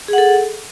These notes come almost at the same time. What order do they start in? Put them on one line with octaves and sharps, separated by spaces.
G#4 F#5 A4